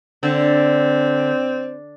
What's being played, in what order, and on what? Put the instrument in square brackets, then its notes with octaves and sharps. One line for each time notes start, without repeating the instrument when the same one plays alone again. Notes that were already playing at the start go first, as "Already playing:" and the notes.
[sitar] D3 [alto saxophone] C4